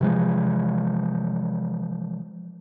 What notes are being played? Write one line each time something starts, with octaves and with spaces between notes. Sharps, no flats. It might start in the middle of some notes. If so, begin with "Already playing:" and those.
C3 E3 F3 G#3